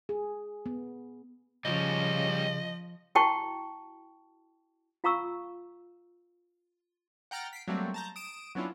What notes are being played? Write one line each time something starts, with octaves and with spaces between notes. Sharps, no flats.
G#4
B3
C#3 F3 G3 C#4 D#5
E4 F#4 G5 A5 C#6
F4 F5 A#5 C#6 E6
F#5 G5 A#5 F6 A6
B6 C7 D7
F#3 G3 A3 A#3 C4
A5 A#5 G6
D#6 D7 E7
F#3 B3 C#4 D4 E4 F4